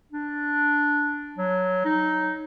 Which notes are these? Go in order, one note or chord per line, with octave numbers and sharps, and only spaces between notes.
D4
F#3
D#4